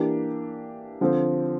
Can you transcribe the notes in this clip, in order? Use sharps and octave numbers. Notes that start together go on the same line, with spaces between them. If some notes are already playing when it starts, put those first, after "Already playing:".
Already playing: E3 A#3 D4 G4
D3 F3 C4